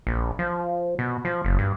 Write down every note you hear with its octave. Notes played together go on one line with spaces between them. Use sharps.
A#1
F3
B2
F3
F#1
G2